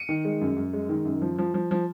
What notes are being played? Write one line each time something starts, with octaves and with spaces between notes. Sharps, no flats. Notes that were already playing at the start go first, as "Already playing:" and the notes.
Already playing: C#7 D#7
D#3
G#3
F#2
F#2
G#3
D#3
F#2
F3
F3
F3
F3